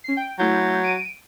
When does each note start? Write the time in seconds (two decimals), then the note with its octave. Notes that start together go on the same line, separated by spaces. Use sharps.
0.04 C#4 C7
0.17 G5
0.39 F#3 A3 E4 G6
0.84 D7 D#7